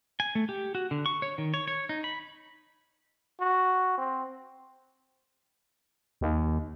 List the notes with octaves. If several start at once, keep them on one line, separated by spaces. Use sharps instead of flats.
G#5
A3
G4
F#4
D3
C#6
C#5
D#3
C#5
C#5
D#4
B5
F#4
C4
D#2